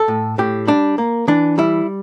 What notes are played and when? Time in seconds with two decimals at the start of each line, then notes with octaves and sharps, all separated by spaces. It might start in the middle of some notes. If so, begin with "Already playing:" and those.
Already playing: A4
0.08 A2
0.38 A2 G4
0.67 G3 D4
0.98 A#3
1.28 E3 D4
1.58 G3 E4